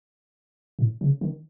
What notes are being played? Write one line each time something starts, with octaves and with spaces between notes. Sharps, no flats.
A2
C#3
D#3